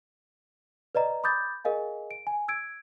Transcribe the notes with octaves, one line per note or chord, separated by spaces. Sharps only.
B4 D5 D#5 A#5
B5 D6 D#6 G6 A6
G#4 A#4 D#5 F5 G#5
D7
G#5
E6 G#6 D7